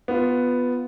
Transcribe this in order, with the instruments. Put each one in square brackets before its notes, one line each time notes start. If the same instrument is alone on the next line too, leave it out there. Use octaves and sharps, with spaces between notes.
[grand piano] B3 F4